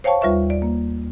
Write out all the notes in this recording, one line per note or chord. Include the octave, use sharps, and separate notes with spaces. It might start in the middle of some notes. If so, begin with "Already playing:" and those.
C5 C#5 F5 G5 A5 C#6
D#2 G3 F4 B4 E5 C#6
D5
A#3